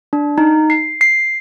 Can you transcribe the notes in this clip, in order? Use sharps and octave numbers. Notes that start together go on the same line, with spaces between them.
D4
D#4
C7
C7